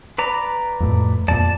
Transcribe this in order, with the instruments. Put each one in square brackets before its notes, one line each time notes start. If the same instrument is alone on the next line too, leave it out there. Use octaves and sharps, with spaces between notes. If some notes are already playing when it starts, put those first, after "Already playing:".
[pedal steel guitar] B4 D5 A#5
[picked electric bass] F2 A2
[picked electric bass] F2 A#2 [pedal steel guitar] D5 A5